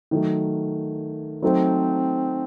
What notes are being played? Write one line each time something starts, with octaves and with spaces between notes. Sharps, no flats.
D#3 F#3 A3
F#3 A3 C4 D#4 A4 C5